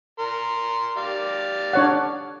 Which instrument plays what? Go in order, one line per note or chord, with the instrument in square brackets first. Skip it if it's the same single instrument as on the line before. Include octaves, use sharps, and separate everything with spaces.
[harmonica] A#4 C6
G4 D5 F5
[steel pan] D4 C#5 F#5